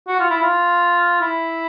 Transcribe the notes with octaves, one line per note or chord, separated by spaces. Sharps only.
F#4
F4
E4
F4
E4